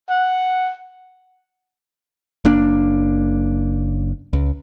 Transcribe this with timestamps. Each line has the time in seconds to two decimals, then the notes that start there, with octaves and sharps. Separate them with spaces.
0.10 F#5
2.45 F#1 A#3 D4
4.33 C#2